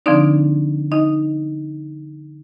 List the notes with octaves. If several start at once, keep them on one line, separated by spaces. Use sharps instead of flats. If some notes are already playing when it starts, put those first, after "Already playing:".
D3 F3 C4 D4 D#4 D5
D#4 D#5